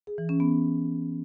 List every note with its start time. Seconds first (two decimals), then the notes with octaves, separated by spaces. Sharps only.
0.07 G#4
0.18 E3
0.29 C#4
0.40 B3